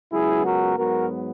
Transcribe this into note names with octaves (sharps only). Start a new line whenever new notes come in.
C#2 C#3 F#3 B3 E4 G#4
F#4 A#4
G#2 F#3 B3 F#4 A#4